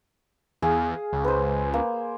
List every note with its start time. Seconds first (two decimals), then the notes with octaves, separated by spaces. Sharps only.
0.62 E2 G#4 F5 D#6
1.13 C#2
1.24 B4 C5
1.74 A#3